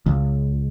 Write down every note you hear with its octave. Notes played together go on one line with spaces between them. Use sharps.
C#2